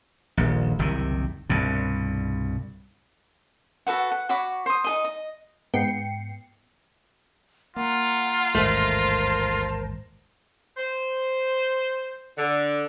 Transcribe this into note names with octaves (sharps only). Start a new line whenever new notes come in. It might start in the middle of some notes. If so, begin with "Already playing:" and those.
D#1 A#1
F#1 C2 C3 D#3
C2 G2 B2
F#4 A4 B4 F#5
F#5
F#4 C#5 B5 D6
C5 D#6
D#4 G#4 D#5
D#5
G#2 B3 G5 C7 C#7
A#3 F4 F#5 A#5
A1 D#2 G#2 A3 A#4 C5 A5
C5
D3